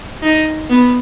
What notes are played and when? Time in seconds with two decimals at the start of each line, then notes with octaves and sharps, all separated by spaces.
0.22 D#4
0.70 B3